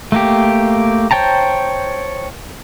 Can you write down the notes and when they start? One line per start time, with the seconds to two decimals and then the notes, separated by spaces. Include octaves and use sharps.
0.12 A3 A#3 G4
1.11 C5 C#5 G5 A5 A#5